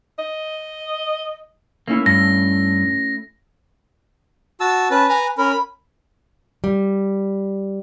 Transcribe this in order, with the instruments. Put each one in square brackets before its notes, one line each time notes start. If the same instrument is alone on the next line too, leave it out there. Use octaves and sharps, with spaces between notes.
[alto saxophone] D#5
[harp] A3 C#4 E4 [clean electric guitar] A#3
[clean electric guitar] G2 [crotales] A#6
[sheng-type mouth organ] F#4 A5 E6
C#4 B4 A5
[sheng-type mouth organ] B4 A#5 [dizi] G#5
[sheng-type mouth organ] C#4 A#4 [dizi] B5
[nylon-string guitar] G3